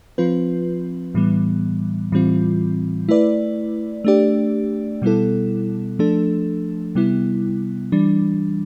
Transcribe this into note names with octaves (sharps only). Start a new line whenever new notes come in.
F3 C4 F4 B4
A2 E3 G3 B3
A2 E3 G3 C4 F4
A3 E4 B4 D5
A3 D4 G4 D5
B2 G3 B3 E4 A4
F3 A3 D4 A4
C3 G3 B3 E4
E3 G3 D4